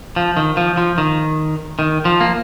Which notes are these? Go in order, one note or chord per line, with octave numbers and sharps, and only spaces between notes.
F3
D#3
F3
F3
D#3
D#3
F3
A#3